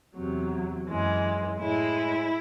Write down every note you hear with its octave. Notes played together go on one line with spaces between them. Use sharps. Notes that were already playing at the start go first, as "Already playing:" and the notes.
E2 C3 F#3
F#2 E3 G#3
A2 G#3 E4